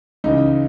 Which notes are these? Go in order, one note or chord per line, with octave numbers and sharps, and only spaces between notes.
C#2 C#3 E3 D#4